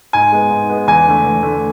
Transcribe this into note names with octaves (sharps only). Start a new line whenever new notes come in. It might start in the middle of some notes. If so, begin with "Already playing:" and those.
G#2 G#5
G#3 B3
G#2
G#3 B3
E2 G#5
D3 A3
E2
D3 A3